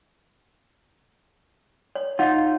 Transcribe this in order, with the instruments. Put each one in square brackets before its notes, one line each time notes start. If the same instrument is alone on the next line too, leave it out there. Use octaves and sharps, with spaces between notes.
[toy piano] C#5
[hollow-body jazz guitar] D#4 F4 [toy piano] F#5